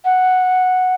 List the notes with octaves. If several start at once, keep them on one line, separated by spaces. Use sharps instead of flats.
F#5